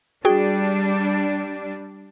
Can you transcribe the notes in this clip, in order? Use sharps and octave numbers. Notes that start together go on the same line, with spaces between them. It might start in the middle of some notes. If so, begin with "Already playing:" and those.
G3 D4 F#4 G#4 G5